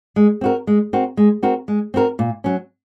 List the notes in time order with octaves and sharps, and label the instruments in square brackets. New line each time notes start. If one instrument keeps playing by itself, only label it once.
[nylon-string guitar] G#3
C4 F#4 A#4
G#3
C4 F#4 A#4
G#3
C4 F#4 A#4
G#3
C4 F#4 A#4
A#2
F#3 C#4